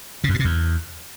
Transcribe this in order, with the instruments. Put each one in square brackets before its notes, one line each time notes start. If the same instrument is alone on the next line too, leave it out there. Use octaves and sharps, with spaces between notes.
[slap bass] C#3
F#2
A2
C3
E2